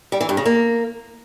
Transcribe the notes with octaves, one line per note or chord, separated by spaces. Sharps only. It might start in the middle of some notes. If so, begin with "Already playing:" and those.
G3
E3
G2
C#3
A#3